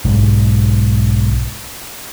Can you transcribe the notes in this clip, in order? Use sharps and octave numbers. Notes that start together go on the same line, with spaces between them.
B1 G#2